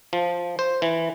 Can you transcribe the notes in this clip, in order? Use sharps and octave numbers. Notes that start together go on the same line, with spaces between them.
F3
C5
E3